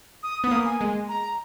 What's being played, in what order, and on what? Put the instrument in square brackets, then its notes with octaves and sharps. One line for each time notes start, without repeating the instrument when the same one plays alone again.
[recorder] D#6
[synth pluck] B3 [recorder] D#6
[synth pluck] A#3
[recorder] G#5
[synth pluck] G#3
[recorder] A#5